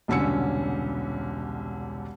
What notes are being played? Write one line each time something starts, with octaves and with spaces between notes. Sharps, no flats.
E1 C2 D3 C#4 E6 C#7